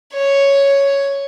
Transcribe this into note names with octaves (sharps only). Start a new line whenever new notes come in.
C#5